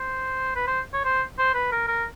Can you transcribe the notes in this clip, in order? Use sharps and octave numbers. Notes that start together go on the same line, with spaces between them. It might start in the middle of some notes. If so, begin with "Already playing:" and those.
Already playing: C5
B4
C5
C#5
C5
C5
B4
A#4
A#4